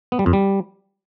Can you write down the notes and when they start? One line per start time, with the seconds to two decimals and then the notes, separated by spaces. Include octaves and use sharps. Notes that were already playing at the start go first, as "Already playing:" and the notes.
0.12 B3
0.19 G3
0.26 F2
0.33 G3